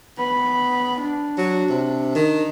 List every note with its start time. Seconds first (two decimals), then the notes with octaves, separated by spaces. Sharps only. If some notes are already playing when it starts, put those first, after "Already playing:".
0.19 B3 B5
1.01 D4
1.38 F#3
1.70 C3
2.15 D#3